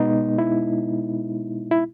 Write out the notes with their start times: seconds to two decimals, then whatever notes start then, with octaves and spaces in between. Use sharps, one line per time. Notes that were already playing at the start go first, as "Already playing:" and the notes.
Already playing: B2 G#3 B3 D#4
0.38 E4
1.71 E4